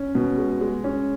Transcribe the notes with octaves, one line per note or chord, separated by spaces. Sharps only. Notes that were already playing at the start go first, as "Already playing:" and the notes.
Already playing: C#4
B2
G#3
G#3
C#4